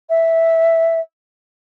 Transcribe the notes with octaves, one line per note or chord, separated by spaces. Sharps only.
E5